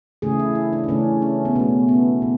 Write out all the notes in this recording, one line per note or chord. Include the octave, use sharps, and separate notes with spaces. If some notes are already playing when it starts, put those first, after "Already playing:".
C#3 E3 A3 G#4
E4
E4
D4
D4
C#3 E3 A3 C#4
C#4
B3
B2 A3 C#4
B3
B2